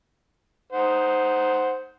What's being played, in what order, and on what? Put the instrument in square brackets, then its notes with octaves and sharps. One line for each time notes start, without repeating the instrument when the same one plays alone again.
[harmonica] D#4 C5 F#5